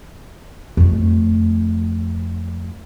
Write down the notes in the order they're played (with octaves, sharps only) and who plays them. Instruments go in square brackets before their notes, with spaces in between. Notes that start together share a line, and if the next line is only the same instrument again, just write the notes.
[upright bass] F2 A3